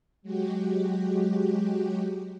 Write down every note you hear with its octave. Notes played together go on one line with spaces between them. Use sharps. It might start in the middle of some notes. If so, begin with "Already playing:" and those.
F#3 G#3 F#4 G4